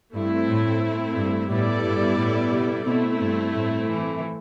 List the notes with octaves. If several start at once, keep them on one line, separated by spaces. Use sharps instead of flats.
G2 A3 C4 E4
A2
G2
A2 G3 B3 E4 A4 D5
G2
A2
B2
B2 A3 C4 E4
G2
A2
E3